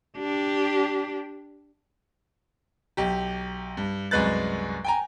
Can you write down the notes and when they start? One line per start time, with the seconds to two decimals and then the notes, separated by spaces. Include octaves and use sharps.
0.18 D4 G4
2.97 B1 G4
3.77 G2
4.11 C2 F#2 G#3 B4 F#6 A6
4.85 G5 G#5 A#5